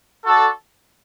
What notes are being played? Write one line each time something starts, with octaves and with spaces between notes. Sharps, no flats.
D4 F#4 A4